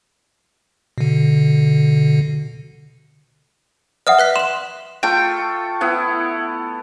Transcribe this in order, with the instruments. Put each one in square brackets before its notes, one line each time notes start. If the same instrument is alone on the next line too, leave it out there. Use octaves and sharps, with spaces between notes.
[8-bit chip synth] B2 D3
[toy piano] D5 F#5 [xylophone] E5 D#6 F6
[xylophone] B4 F#6 B6
[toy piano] C6 [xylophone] E7 F#7
[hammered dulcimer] A3 F4 A4 [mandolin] G5
[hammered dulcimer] B3 E4 F#5